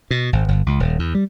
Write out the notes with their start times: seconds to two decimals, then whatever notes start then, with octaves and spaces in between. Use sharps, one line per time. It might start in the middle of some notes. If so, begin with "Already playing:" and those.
0.11 B2
0.33 G#1
0.48 G1
0.66 C#2
0.80 D#1
0.99 E2
1.15 G3